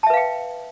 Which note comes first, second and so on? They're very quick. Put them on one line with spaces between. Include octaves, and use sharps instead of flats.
A5 E5 B4 F5 G5